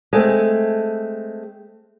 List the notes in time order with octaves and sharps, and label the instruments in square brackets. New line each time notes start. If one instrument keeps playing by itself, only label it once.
[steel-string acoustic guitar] G#3 A3 C4